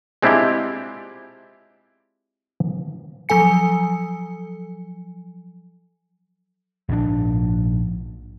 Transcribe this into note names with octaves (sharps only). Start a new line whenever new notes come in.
G#3 C4 D4 E4 F4 G4
F3 F#3 A4 G#5 C#7
A#1 G#2 B2 D4